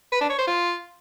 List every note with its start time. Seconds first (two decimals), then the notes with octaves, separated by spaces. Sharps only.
0.12 B4
0.21 D4
0.30 C#5
0.39 C5
0.47 F4